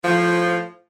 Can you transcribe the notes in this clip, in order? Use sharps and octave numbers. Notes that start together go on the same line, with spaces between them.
A2 F3